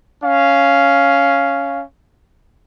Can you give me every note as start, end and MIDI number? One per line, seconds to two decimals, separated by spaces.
0.23 1.83 61
0.23 1.83 77